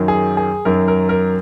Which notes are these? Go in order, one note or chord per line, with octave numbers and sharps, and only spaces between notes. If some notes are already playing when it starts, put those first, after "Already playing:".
Already playing: F#2 D#3 F#3
G#4
G#4
F#2 D#3 F#3 A#4
A#4
A#4